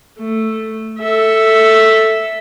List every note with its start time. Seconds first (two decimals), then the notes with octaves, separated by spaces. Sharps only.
0.20 A3
1.00 A4 E5